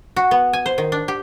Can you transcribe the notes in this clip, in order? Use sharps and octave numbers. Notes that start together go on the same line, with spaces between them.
F#4
B3
G#5
C5
D#3
D4
G4